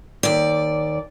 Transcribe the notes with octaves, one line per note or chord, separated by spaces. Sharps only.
D#2 D5